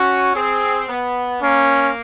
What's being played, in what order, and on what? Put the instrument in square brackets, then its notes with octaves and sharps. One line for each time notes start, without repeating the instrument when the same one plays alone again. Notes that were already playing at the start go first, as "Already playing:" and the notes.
Already playing: [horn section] C#4 [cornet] F#4
[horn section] C4 [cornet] G#4
[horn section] B3
[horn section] A#3 [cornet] C#4